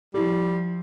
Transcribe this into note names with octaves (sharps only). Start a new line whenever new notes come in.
F3 G3 E4 G4